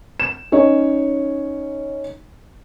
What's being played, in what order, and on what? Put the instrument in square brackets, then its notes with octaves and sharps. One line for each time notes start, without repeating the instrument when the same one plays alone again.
[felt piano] E7
C#4 D#4 C#5 D#5